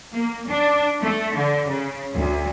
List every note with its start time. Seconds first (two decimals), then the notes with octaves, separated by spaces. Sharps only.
0.13 A#3
0.48 D4
1.02 A3
1.35 D3
1.68 C#3
2.15 D2